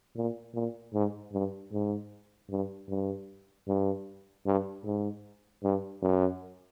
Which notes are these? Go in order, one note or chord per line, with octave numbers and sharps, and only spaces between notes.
A#2
A#2
G#2
G2
G#2
G2
G2
G2
G2
G#2
G2
F#2